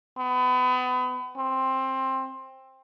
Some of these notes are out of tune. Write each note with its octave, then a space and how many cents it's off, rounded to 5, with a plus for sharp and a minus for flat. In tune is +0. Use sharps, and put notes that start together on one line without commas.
B3 +30
C4 +15